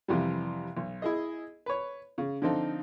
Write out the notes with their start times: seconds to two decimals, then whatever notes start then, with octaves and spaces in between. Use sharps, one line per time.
0.08 F2 C3 E3 G3
0.77 B1
1.02 E4 G#4 D#5
1.66 B4 C#5
2.18 C#3
2.42 D3 F3 C4 D#4 A4